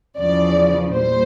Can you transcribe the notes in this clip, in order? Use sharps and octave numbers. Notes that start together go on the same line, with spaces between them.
E2 C#3 F3 D5
A#2 G3 C5